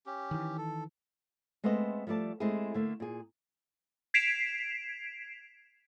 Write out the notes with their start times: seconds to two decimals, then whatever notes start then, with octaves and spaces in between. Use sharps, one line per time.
0.06 C#4 G4
0.31 D#3 E3
0.58 A4
1.64 G#3 A3 B3 C4 B4 D#5
2.07 F3 G3 A3 D5 A5
2.40 G#3 A3 C4 E4 G4 G#4
2.74 D3 A3 A#3
3.00 A#2 G#4
4.14 G#6 B6 C7 D7 E7 F7